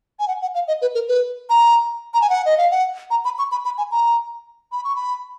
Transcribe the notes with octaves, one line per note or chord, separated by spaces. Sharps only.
G#5
F#5
F#5
F5
D#5
B4
A#4
B4
A#5
A#5
G#5
F#5
D#5
F5
F#5
A#5
B5
C#6
B5
B5
G#5
A#5
B5
C#6
B5